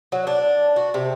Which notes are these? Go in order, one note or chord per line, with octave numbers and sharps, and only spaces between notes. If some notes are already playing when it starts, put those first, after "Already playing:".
F#3
D4
F#4
C3